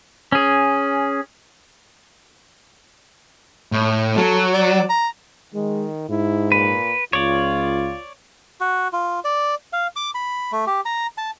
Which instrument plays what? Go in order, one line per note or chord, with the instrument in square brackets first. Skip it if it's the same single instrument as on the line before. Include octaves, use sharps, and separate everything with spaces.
[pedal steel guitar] C#4 G#4
[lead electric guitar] A2
[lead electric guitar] F#3 [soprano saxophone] A4
[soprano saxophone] D5
A#5
[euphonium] D#3 [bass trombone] G#3
[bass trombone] G#2 [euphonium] E4
[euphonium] A#2 [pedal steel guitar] B4
[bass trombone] C#2 [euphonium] F4 [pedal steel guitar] C#5 D5
[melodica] F#4
F4
D5
F5
D6
B5
A3
G4
A#5
A5